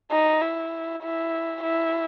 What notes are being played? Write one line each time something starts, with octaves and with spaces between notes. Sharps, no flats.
D#4
E4
E4
E4